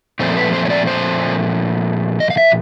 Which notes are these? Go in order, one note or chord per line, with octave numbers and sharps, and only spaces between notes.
A#2 F3 A3 C4 C5
B4
C5
C#5
D5
C5
D#5
F5
E5